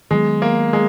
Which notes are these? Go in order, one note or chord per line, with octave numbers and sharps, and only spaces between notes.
D#3 F#3 G#3 B3
A#3
G#3